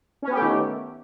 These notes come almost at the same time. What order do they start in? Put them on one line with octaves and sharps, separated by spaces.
C#4 B3 G4 A3 D#3